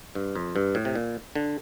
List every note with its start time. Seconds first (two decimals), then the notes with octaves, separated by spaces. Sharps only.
0.15 G2
0.35 F2
0.56 G2
0.75 A2
0.85 C3
0.95 A#2
1.35 D3